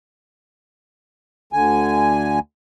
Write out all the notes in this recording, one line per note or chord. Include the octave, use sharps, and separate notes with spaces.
D2 D3 G#5